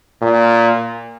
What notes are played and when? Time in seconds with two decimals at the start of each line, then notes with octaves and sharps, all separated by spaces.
0.22 A#2